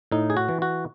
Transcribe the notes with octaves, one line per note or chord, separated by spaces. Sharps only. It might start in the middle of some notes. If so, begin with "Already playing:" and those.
A2 D#4
G#4
F#4
E3
F#4